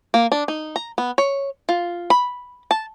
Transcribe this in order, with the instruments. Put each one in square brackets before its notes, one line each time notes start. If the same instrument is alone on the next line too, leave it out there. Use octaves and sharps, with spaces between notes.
[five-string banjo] A#3
D4
D#4
A#5
B3
C#5
F4
B5
A5